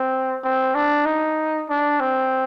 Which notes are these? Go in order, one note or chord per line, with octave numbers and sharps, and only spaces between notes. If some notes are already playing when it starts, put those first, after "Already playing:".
Already playing: C4
C4
D4
D#4
D4
C4